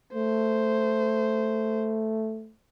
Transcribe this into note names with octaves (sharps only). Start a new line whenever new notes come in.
A3 C5